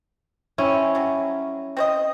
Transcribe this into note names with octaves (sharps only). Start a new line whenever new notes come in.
C4 C#4 E4
F#3 G3
C4 C5 D#5